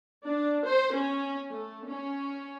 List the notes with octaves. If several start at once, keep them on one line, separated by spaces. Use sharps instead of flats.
D4
C5
C#4
A3
C#4